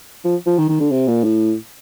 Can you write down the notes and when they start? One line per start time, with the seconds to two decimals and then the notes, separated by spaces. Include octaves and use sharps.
0.24 F3
0.46 F3
0.58 D#3
0.69 D#3
0.80 D3
0.91 C3
1.07 A#2
1.24 A2